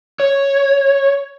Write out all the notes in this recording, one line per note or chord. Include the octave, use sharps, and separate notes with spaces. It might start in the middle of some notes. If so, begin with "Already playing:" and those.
C#5